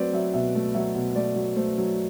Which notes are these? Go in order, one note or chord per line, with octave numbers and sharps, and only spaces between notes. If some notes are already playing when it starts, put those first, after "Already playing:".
Already playing: F#3 A3 C4 B4 D5
F#3 E5
B2 E5
A3
F#3 E5
B2
A3 D5
F#3
A3 C5
F#3